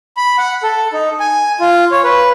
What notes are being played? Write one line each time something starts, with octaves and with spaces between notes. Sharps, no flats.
B5
F#5
A4
D#4
G#5
F4
C#5
B4